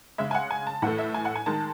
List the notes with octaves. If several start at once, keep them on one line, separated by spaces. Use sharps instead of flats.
C#3 G#3 E5
G#5
F#5
G#5
A5
A2 E3 A3 F#5
E5
G#5
F#5
G#5
D#3 G#3 A5